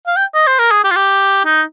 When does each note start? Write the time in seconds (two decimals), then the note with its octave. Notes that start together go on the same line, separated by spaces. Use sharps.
0.07 F5
0.16 G5
0.34 D#5
0.47 C5
0.59 A#4
0.71 G#4
0.84 G4
0.91 F4
0.96 G4
1.45 D#4